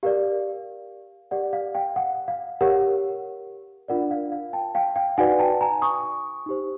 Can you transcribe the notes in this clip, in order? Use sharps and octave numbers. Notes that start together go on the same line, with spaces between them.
G4 A#4 D5 F5
G4 A#4 D5 F#5
F5
F5 G5
F#5
F5
G4 A#4 C#5 F#5
D4 F4 A#4 D5 F#5
F5
F5
G5 A5
F5 G5
F5 G5
D#4 F#4 B4 D5 F#5 G#5
G5 A5
G#5 A#5
C#6 D#6
D#4 G4 C5